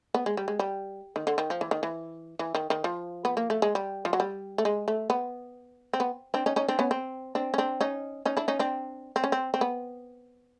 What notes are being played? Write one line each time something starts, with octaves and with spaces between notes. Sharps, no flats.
B3
G#3
G3
G#3
G3
D#3
D3
D#3
F3
E3
D#3
E3
E3
D#3
D#3
F3
B3
A#3
A3
G#3
G3
F3
F#3
G3
A3
G#3
A3
B3
C4
B3
C4 D4
C#4 D#4
C#4 D#4
C4 D4
B3 C#4
C4
C4 D4
C#4
C4 D4
C#4 D#4
C#4 D#4
D4 E4
C#4 D#4
C4 D4
C4
C#4
C4
C4
B3